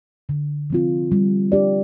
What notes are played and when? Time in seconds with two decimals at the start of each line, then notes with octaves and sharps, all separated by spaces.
0.29 D3
0.70 F3 C4 F4
1.12 G3
1.52 D4 G4 D5